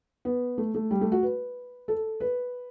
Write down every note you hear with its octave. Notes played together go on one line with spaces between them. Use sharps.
B3
A3
A3
G3
A3
F#4
B4
A4
B4